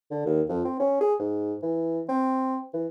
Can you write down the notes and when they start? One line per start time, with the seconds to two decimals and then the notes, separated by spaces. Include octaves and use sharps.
0.11 D3
0.26 D#2
0.49 F2
0.65 C4
0.80 C#4
1.01 G#4
1.19 G#2
1.62 E3
2.09 C4
2.74 E3